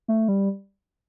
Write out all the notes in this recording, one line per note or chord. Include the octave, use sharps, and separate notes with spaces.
A3
G3